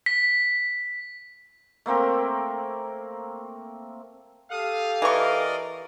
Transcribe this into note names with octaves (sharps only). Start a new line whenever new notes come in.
B6
A3 A#3 C4 A#4
G4 A4 F5 D#6
E3 A#4 D5 D#5 C#6